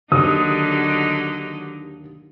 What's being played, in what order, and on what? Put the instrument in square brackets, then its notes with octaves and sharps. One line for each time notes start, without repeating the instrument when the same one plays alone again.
[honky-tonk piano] D#2 D#6 [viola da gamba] D3 F#3 D#4